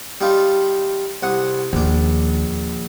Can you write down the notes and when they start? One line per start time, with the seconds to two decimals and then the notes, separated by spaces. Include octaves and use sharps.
0.21 G3 D#4 F4
1.23 C2 F#5 D#6
1.73 A#1 D#2 D4